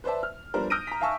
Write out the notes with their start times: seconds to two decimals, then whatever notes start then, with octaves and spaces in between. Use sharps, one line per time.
0.04 B4 C5 D5 E5 A5
0.23 F6
0.54 F3 G3 B3 D4 A#4 C5
0.70 D#6 F6 G6 A#6 D7 D#7
0.87 A#5 B6
1.01 E5 F5 G#5 A5 C#6 E6